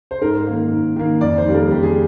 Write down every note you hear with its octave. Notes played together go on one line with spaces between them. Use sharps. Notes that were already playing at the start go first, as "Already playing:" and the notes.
C5
G#2 A#4
D#3 A#3
G#2
D#3 A#3
F2 D5
C5
D#3 G3 A#3
A#4
F2 G4
G#4